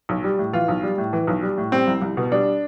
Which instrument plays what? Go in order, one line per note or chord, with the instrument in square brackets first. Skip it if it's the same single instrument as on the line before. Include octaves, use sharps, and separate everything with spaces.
[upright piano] B1
G3
A2
E3 F4
B1
G3
A2
E3
B1
G3
A2
G3 C4
C2
C2
B2
G3 D4